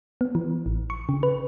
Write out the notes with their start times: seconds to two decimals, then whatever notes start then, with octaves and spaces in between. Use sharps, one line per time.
0.21 B3
0.35 E3
0.66 A1
0.90 C#6
1.09 C#3
1.23 B4